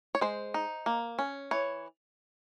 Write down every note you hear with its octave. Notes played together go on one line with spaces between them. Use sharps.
C#5
G#3 C5
D#4
A#3
C#4
E3 C#5